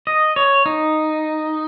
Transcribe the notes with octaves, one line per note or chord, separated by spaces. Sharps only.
D#5
C#5
D#4